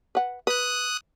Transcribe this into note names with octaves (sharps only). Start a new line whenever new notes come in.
B4 F#5
B4 D#6 F#6